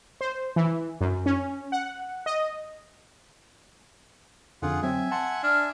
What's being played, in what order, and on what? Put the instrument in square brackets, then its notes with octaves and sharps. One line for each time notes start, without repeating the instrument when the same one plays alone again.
[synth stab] C5
E3
F#2
C#4
F#5
D#5
[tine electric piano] F2 D3 [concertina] F4 G#4 F#5
[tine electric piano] F#3 C4 [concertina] E5 G#5
[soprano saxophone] F#5 [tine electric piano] A5 C6
[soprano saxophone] D4 [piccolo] F6